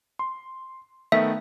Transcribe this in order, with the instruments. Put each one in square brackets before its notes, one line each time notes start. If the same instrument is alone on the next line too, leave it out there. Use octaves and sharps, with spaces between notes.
[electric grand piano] C6
[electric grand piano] D#3 A3 B3 [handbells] E5